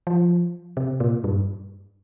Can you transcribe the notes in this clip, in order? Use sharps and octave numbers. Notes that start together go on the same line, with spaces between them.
F3
C3
A#2
G2